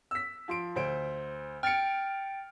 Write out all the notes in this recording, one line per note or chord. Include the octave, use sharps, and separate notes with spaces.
E6 B6
F3 C6 D7
D2 C5 D7
G5 F6 A6 C#7 D7